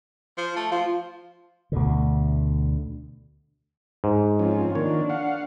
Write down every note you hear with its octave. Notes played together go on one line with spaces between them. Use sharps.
F3
A3
F3 F4
D2 B2 D3
G#2
F3 C4 C#4 F4
D#3 A#3 D4 C#5
F5 F#5